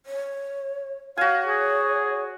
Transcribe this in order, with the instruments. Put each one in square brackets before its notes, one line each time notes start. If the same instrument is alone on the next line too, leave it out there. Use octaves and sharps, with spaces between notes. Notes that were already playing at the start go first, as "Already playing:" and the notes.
[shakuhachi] C#5
[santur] F#4 G#5 [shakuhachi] C#5 [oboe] F5
[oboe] G#4